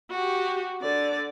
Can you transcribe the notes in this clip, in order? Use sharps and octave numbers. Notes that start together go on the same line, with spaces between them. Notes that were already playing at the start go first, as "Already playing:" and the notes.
F#4 G4
D3 D5